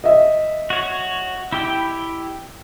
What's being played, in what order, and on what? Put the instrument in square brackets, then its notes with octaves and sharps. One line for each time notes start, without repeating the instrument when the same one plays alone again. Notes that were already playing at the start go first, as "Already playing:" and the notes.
[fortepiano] D#5 E5
[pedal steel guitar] F#4 C#5
E4 G4 G5